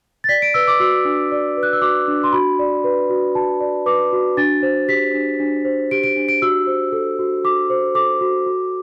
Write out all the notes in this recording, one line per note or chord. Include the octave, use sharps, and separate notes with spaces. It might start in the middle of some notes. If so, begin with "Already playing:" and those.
A6
D5 B6
D7
B4 E6
D6
F#4 E6
D4
D5
B4
F#6
E6
F#4 D6
D4
C6
F#4 B5
D5
B4
F#4
F#4 A5
D5
B4 D6
F#4
D4 A6
C5
G4 B6
D4
D4
C5
G4 D7
D7
D4
D7
F#4 E6
C5
A4
F#4
F#4 D6
C5
A4 D6
F#4
F#4